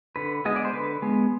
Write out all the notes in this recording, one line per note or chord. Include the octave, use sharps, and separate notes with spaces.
D3 B4
G#3 B3 D#5
D5
C5
D3 B4
G#3 B3